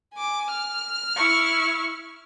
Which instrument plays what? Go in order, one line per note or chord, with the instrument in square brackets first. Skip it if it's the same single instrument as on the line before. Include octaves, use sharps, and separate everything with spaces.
[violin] G#5 D6
F6
[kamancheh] E4 C#6